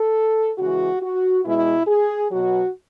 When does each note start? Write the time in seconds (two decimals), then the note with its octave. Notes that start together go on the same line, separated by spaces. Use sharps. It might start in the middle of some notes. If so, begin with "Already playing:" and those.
Already playing: A4
0.58 C#3 E3 G#3 F#4
1.02 F#4
1.45 B2 G#3 E4
1.87 G#4
2.31 B2 F#3 F#4